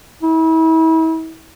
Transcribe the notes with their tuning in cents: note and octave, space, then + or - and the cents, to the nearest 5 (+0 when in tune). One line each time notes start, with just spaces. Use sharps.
E4 -35